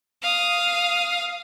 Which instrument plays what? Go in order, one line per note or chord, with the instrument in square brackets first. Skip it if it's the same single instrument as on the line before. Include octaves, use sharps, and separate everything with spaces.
[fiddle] F5 D#6